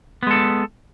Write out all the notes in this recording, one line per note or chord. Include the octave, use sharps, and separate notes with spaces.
G#3 B3 A4